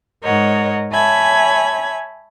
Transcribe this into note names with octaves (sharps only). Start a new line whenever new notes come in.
G#2 A#4 C#5 D#5 F#5
C#5 E5 G#5 A5 B5 G#6